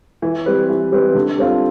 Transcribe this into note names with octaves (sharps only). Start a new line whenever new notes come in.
E3
G3 C4 G4 B4
E3
G3 C4 G4 B4
D3
G3 C4 F4 A4